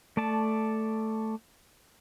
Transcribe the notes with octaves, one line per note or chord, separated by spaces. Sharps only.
A3 D5 A5